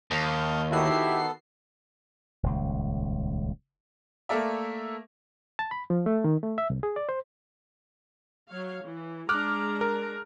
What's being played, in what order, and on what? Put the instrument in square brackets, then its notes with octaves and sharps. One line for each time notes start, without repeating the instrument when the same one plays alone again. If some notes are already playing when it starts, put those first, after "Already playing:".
[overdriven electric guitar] D#2 [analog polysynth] F5 G6 [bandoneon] A5 C#6 D#6
[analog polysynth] D#3 F#4 C7 [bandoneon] B3 A4 [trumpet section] E4 G4
[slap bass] D#1 C#2
[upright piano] A3 A#3 A4 A#4 D5 E5
[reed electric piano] A5
B5
F3
A3
D#3
A3
E5
C2
G#4
D5
C5
[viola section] F#3 C#5 F5
E3
[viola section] G#3 D4 A#5 [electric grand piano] D6 F6 F#6
[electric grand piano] A#4